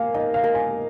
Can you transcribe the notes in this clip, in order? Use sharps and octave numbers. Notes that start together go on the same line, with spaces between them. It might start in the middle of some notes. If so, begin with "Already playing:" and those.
Already playing: A#3 F5 G#5
D#4 D#5
F5
A#4
G#5